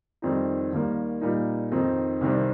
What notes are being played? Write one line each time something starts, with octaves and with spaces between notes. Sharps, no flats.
F2 D#3 G3 C4 D#4
D#2 D#3 G3 A#3
A#2 G3 A#3 D#4
F2 D#3 C4 D#4
C2 C3 D#3 G3 C4